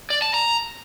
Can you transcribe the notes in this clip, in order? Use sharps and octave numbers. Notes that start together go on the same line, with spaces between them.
D5
A5
A#5